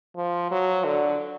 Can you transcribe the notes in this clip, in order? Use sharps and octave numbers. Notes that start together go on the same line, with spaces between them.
F3
F#3
D3